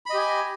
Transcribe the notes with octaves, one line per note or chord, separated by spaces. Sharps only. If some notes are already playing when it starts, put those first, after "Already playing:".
G4 D#5 G#5 B5